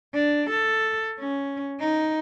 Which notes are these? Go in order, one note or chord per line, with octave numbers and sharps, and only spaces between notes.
D4
A4
C#4
D#4